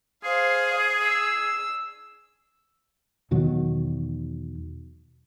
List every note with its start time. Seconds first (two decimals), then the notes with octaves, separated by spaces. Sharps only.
0.24 G#4 C5 F5
1.03 E6
3.31 E2 B2 D#3 F#3